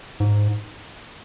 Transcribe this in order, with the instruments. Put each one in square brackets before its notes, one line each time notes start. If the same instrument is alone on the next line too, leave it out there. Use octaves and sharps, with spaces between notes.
[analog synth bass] G#2